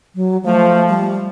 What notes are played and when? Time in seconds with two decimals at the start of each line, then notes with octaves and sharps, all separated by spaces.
0.15 F#3
0.44 F3 A3
0.88 G3